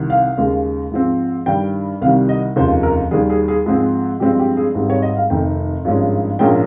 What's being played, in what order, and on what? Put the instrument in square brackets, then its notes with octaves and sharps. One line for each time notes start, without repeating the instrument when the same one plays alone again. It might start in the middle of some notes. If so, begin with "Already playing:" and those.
Already playing: [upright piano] C2 C3 D#3
F5
D#2 C#3 G#3
G#2 F3 C4
G2 D#3 G3 G5
C2 C3 D#3 G3 F5
D#5
F1 D#2 C#3 F3 C5
A#4
D#2 D#3 G3 G#4
G#4
G#4
G#2 F3 G#3 C4 G#4
G2 F3 G#3 C4 G4
G4
G#4
G#1 G#2 G3 C4
C#5
D#5
F5
F1 F2 D#3 G5
G#1 G2 F3 G#3 C#4
A#1 G#2 F3 A#3 C#4 G5